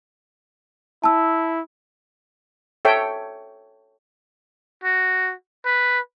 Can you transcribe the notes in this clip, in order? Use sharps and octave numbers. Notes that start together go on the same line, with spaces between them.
E4 A5 E6
A4 C#5 E5 G5
F#4
B4